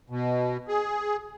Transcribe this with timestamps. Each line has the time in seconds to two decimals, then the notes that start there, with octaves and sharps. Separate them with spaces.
0.10 B2
0.68 G#4